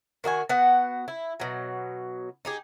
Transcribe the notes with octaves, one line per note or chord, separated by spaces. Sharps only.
D#3 F#4 D#5 G#5
B3 F#4 F#5
E4
B2 F#3
D#4 G4 G#4